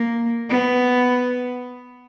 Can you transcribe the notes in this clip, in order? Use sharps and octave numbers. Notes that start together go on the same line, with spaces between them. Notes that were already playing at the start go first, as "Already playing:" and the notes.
Already playing: A#3
B3